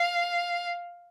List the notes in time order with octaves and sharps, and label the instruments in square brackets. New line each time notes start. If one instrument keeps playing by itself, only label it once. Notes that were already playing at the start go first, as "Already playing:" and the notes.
Already playing: [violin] F5